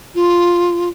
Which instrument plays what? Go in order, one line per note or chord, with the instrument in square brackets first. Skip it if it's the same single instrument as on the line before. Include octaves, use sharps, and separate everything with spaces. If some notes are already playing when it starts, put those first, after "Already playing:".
[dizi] F4